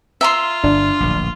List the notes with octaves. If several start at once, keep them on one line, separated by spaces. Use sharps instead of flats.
F4 E5 A#5 C6
G1 D4
D1 A#1